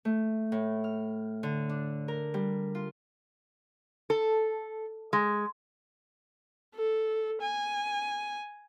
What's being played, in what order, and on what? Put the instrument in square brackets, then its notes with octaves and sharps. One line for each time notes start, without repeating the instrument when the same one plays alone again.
[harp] A3
A2
F6
D3
D4
A#4
G3
F4
[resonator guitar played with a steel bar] A4
G#3
[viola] A4
G#5